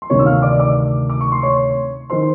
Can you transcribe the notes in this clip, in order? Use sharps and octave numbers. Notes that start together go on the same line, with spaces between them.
C6
D2 C3 D#3 C#5 C#6
E6
F5 F6
D5 D6
D5 D6
D6
C#6
C6
C#5 C#6
D#3 C5 C6